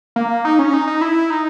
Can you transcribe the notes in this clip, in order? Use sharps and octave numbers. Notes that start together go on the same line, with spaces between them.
A#3
D#4
C#4
D#4
D#4
E4
D#4